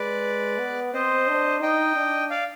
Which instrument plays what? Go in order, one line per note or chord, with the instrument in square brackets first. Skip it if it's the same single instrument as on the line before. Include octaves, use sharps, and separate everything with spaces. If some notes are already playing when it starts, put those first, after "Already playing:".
Already playing: [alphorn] G#3 [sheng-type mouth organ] B4 D5
[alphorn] B3
[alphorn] C4 [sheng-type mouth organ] C5 D#5
[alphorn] D4
[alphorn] D#4 [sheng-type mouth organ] D#5 G5
[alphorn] D4
[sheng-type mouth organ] D5 F5